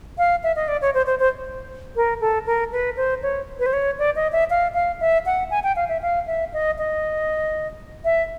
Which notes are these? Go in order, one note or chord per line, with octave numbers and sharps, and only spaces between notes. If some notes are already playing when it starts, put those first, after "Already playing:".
F5
E5
D#5
D5
C#5
C5
C5
C5
A#4
A4
A#4
B4
C5
C#5
B4
C5
C#5
D5
D#5
E5
F5
F5
E5
F#5
G#5
G5
F5
E5
F5
E5
D#5
D#5
E5